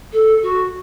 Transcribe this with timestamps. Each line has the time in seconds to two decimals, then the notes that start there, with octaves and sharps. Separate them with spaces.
0.12 A4
0.42 F#4